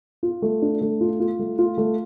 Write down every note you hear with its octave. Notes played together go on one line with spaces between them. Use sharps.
F4
A3
D4
A3
F4
F4
A3
F4
A3